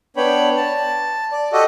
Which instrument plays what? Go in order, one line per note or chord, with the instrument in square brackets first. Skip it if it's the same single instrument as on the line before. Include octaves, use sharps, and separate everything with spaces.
[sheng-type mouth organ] B3 D4 C#5 G5 B5
A5
D5
F#4 G4 A4 D#5